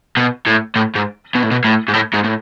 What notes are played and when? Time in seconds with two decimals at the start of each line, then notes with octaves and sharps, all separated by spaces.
0.17 B2
0.47 A2
0.76 A2
0.96 G#2
1.35 B2
1.43 A2
1.51 B2
1.64 A2
1.88 G#2
1.93 A2
2.13 G#2
2.24 A2